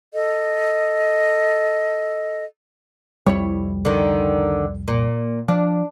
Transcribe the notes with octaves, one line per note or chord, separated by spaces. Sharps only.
A4 D#5
C2 F2 G3 E4 C#5
D3 D#3
A#2
F3 D4